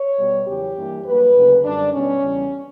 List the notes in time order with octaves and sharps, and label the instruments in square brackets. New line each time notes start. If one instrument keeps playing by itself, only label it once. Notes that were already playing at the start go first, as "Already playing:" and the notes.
Already playing: [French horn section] C#5
B2 G3 B3
E2 C#3 F#3 G4
G2 E3 A#3
G2 F#3 A#3 B4
D2 C#3 F#3 A#3
F#2 D3 G3 D4
B2 G3 B3 C#4
E2 C#3 G3